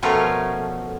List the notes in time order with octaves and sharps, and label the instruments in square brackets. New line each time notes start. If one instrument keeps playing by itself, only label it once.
[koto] B2 F3 A3 C#4 F4 A#4